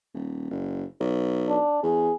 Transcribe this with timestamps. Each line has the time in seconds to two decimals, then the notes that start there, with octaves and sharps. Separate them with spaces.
0.14 D#1
0.51 F#1
1.00 B1
1.48 D4
1.83 E2 G#4